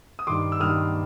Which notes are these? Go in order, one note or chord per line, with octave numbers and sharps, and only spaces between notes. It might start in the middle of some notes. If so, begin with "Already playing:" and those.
D#6
G2 D#3 C6 D6
E6
G2 D#3 D#6 F6